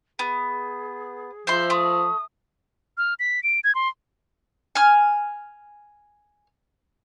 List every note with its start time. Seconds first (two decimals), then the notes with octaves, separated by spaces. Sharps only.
0.19 B3 G#4
1.47 F3 C5 E5 C6
1.70 A3 D#6
2.98 F6
3.20 B6
3.43 D7
3.64 G#6
3.75 C6
4.75 G#5 F6